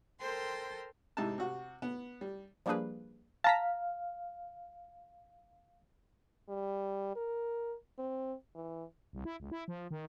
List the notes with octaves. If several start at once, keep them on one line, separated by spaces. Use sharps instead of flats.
A4 A#4 C5 G5 C6
G#2 C3 D#4 E4 A5
C3 F#4
B3
G3
F3 G3 A#3 D4 G#4 B4
F5 A5 A#5 B6
G3
A#4
C4
E3
C2
E4
C#2
E4
F3
D#3